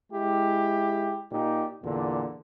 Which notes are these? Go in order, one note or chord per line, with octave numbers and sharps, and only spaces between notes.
G#3 E4 G4
A#2 D#4 G4
E2 A#2 D3